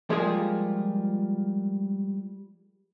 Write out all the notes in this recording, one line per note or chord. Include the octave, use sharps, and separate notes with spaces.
F3 G3 G#3 A#3 F4 G#4